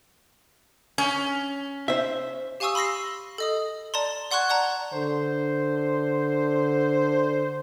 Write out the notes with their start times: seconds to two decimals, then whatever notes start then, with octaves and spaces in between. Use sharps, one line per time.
0.98 C#4
1.88 C5 E5
2.60 G4 F5 G#5 C#6 D#6 E6
2.75 B5 C6 E6 A#6 C7
3.38 A4 D#5 D#6
3.94 D5 A5 A#5 C6
4.31 D5 F#5 C6 C#6 F#6 G#6
4.50 D5 F#5 A5 A#5
4.94 D3 C5